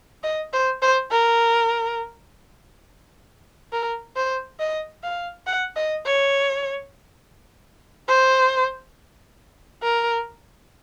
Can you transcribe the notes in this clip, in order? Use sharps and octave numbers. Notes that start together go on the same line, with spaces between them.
D#5
C5
C5
A#4
A#4
C5
D#5
F5
F#5
D#5
C#5
C5
A#4